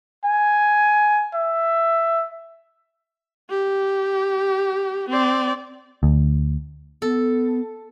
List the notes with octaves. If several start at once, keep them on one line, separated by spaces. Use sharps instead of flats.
G#5
E5
G4
C4 D5
D2
B3 A4